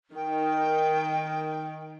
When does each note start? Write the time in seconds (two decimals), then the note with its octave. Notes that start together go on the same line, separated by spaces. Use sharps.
0.16 D#3 G5